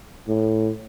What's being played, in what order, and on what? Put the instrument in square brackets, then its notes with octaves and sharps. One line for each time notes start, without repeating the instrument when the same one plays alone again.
[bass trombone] A2